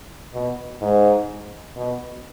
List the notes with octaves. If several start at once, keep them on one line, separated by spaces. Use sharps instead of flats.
B2
G#2
B2